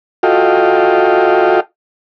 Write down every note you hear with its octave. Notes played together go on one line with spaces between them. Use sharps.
F4 F#4 A4 D#5 F5 G5